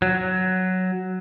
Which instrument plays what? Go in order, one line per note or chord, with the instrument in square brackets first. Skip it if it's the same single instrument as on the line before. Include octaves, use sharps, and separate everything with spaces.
[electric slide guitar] F#3